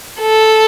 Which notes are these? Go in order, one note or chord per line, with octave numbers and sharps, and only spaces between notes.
A4